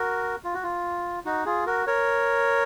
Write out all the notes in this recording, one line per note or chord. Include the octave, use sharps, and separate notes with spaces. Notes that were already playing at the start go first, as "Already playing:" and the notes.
Already playing: F#4 A#4
F4
F#4
F4
D#4 F#4
F4 G#4
F#4 A#4
A#4 C#5